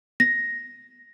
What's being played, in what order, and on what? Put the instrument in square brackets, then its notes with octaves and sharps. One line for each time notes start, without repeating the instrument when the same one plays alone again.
[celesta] A#6